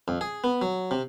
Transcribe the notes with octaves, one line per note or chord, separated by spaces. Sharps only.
F2
G#4
B3
F#3
C3